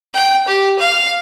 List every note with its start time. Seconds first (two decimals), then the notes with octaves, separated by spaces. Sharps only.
0.14 G5
0.48 G4
0.79 F5